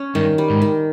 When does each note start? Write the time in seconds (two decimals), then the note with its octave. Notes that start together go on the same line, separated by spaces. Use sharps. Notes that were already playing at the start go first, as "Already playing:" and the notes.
Already playing: C#4
0.15 G2 D#3
0.38 G3
0.50 G#2
0.62 D#3